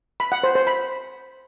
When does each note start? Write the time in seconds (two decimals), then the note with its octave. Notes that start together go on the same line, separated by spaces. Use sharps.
0.20 B5
0.32 F#5
0.43 C5
0.55 C5
0.67 B5